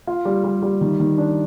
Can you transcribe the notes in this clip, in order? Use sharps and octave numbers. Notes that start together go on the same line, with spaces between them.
F4
G3
G3
G3
D#3
D#3
D4